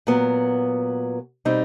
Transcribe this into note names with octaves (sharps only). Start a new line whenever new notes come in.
A#2 F#3 B3
B2 G3 C4 D#4